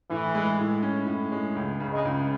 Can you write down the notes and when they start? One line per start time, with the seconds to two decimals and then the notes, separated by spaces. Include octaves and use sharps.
0.10 A2 E3
0.35 G#3
0.59 A2
0.83 C#4
1.07 A2
1.32 G#3
1.56 C#2
1.80 C#3
1.92 G#3
2.05 C#2